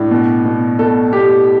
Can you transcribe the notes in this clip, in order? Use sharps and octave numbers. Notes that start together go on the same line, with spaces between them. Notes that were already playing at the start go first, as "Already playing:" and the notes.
Already playing: A2 D4
B2
B2
B2 A4
B2 G4